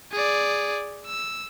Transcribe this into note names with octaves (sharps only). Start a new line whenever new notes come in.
G#4 D5
E6